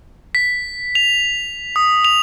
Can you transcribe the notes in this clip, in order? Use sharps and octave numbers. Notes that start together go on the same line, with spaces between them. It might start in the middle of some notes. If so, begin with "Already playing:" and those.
B6
F7
D#6
F7